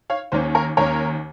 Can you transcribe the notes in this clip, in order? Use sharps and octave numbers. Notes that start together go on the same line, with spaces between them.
C#5 F5
D#2 D#3 A#3 C#4 C5
A#4 C#5
D#2 D#3 A#3 C#4 A#4 C#5